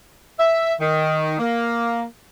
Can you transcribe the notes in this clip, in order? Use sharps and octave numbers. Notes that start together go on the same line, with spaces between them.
E5
D#3
A#3